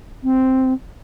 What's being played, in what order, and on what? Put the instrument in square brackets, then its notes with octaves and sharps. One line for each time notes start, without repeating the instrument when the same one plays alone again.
[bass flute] C4